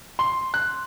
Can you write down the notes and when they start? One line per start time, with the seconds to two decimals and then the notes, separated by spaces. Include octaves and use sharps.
0.19 C6
0.54 F#6